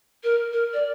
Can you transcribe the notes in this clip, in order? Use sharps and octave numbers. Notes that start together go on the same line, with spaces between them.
A#4
A#4
D5